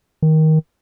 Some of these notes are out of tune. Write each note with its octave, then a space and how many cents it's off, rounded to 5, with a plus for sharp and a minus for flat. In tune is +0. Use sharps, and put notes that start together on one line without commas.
D#3 +15